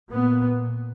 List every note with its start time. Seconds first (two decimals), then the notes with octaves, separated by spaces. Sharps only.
0.11 A#2 B3